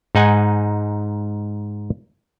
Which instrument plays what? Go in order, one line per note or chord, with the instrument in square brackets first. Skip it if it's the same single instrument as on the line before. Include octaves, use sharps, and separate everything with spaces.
[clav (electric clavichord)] G#2 D#4 F#5 G#5